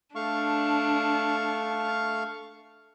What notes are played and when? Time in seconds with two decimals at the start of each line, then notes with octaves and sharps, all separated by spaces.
0.15 A3 D4 F5 C#6